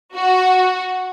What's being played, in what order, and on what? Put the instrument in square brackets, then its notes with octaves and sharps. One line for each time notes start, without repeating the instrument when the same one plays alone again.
[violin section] F#4